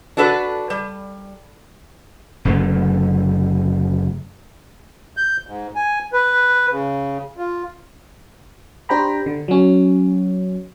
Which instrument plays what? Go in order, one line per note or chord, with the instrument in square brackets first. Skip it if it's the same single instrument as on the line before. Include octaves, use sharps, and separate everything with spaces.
[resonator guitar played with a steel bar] D4 F#4 A4 B4
G3
[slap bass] F#1 F#2 D3 A3
[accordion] G6
G#2
G#5
B4
C#3
F4
[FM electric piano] D4 G4 C5 G5 A#5 B5
D3
F#3 C#4